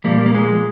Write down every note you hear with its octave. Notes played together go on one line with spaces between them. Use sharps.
A#2 F3 G3 A#3
A#3
G#3